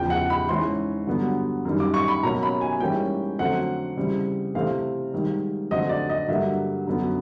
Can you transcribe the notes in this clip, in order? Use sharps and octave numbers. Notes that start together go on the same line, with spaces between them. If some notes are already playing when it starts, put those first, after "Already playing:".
Already playing: E2 C#3 F3 G5
F#5
B5
G#2 E3 G#3 C#4 C6
G2 D3 F#3 B3
F#2 D#3 G3
D6
C#6
B5
B2 F#3 A#3 C#4 A#5
B5
G#5
G#2 E3 G3 A#3 C#4 G5
F2 D3 F#3 A3 C4 F#5
C#3 E3 G3 C4
C3 E3 A3 C4 F5
G#2 D#3 G3
F2 D3 F#3 A3 C4 D#5
D5
D#5
G2 D3 F#3 A#3 E5
F#2 D3 F#3 B3